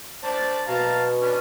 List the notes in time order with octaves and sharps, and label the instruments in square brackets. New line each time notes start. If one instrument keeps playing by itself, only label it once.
[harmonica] C5 D5 A5
[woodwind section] B2 [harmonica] F5 A5 A#5
[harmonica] B3 C#4 D4